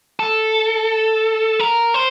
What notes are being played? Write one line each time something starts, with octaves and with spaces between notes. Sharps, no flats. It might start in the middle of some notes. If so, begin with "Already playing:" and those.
A4
A#4
C5